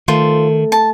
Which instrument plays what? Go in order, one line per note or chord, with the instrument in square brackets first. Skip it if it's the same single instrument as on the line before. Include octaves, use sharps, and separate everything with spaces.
[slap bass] D#3 [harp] A3 [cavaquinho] F4 C5
[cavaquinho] A5